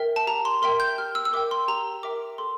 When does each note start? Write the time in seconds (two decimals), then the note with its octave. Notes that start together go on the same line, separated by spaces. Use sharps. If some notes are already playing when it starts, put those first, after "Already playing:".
Already playing: A#4 E5 G5
0.16 A5
0.27 G4 A#5
0.45 C6
0.62 A#4 E5 G5 C6
0.80 G6
0.98 G4 F6
1.15 E6
1.25 E6
1.33 A#4 E5 G5 D6
1.51 C6
1.68 G4 A#5
2.03 A#4 E5 G5 D6
2.38 A4 C6